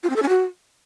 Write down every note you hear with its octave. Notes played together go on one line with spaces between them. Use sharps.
F4
C4
A4
C#4
F#4